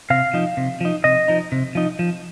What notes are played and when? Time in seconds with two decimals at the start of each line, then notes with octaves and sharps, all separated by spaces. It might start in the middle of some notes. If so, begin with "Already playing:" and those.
0.10 C3 F5
0.34 F3 D#4
0.57 C3
0.81 F3 D#4
1.04 C3 D#5
1.28 F3 D#4
1.52 C3
1.75 F3 D#4
1.99 F3